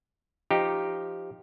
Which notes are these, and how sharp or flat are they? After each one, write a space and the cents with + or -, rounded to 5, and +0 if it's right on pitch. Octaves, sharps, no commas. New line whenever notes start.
F3 +0 D#4 +0 G4 +0